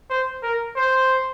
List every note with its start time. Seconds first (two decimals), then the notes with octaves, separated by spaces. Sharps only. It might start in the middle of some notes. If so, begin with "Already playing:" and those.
0.10 C5
0.43 A#4
0.76 C5